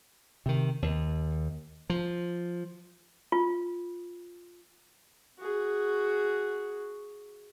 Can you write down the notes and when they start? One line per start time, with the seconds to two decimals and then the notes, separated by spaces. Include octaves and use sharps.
0.46 C3 D#3
0.82 D#2
1.90 F3
3.32 F4
5.39 F#4 G#4